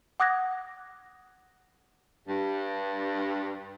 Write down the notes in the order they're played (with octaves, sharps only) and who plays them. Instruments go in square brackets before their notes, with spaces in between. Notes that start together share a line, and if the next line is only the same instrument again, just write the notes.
[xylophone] F#5 D6 D#6 F#6 G#6 A#6
[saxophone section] G2